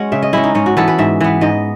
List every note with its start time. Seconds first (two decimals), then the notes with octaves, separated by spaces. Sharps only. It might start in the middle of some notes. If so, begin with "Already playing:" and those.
Already playing: G#3 C#4 C#5 F#5
0.12 C#3 E5
0.22 D#5
0.33 G#3 C#4 E4
0.44 D#4
0.55 G#2 C#4
0.66 F#4
0.77 E3 B3 A4
0.88 B4
0.99 G#2 E5
1.21 E3 B3
1.41 G#2 D#5